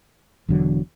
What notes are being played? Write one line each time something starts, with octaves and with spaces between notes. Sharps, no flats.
E1 E2 D3 F#3